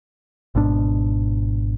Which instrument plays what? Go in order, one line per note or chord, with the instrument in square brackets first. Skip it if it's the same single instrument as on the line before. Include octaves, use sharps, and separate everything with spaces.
[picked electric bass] G#1 G#2 B2 D4